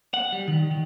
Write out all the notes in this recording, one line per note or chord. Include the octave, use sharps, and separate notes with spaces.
F#5
G3
D#3
D#3